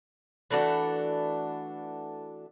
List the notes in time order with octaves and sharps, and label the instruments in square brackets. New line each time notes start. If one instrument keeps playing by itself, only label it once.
[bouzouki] E3 A3 D4 F#4